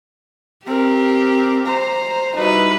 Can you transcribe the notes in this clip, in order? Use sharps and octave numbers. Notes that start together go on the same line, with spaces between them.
C4 G4 A#4
C5 A#5
G3 D#4 E4 F#4 B4